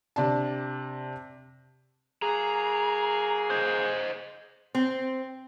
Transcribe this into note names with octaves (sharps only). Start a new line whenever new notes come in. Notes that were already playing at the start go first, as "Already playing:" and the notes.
C3 D4 A5
F#3 A#3 G#4 A#5
C5 D#5
C4